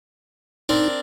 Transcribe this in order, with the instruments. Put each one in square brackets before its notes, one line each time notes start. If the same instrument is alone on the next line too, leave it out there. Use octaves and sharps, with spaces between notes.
[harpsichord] C4 D4 A#4 [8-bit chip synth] D#4